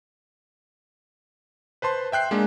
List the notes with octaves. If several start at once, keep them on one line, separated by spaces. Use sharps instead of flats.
B4 C5 A5 C6
E5 G5 F#6 C7
G#3 A#3 D4